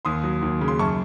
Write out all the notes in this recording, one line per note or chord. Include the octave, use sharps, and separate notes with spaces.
D#2 C6 D#6
F#3
D#2
C#3
C6
F#2 A5 C#6